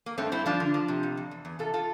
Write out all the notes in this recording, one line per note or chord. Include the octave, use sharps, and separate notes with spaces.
A#3
G2 A3 C4
G2 C4 E4
F3 D4 F4
D3
F3
C3
F2
F2
E2
E2
C3 F4 A4
F4 A4